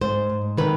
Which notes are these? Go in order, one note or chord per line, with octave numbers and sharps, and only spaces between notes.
G#2 C5
G#2
D#3 B4